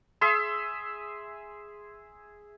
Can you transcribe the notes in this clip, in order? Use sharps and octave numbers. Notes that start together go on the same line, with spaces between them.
G#4 E5 C6